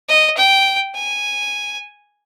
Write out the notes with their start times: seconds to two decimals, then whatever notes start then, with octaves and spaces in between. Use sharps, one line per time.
0.09 D#5
0.37 G5
0.95 G#5